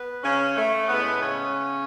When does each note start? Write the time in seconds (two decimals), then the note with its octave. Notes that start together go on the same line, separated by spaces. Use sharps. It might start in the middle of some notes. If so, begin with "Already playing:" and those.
Already playing: B3
0.23 C#3 C#4
0.56 A3
0.88 A2 G#3 B3
1.21 C#3 C#4